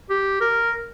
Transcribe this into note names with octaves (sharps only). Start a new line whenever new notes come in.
G4
A#4